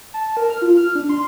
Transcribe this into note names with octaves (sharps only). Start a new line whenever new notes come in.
A5
A#4
F6
F4
F6
D4
C6